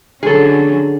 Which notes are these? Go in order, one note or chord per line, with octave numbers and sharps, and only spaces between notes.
D3 F#3 C#4 G#4 A4